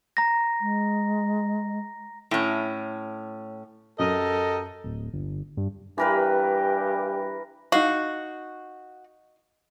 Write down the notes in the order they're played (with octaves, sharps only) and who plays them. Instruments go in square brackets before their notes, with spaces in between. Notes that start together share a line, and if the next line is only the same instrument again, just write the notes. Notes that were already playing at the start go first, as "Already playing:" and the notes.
[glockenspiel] A#5 A#6
[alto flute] G#3
[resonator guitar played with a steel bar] A2 C#4
[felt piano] F#2 [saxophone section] G4 A#4 D#5 [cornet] A4
[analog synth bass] D1
G1
G2
[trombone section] G2 G4 [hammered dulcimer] E3 A#4 B4
[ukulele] D#4 F5 [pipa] F#4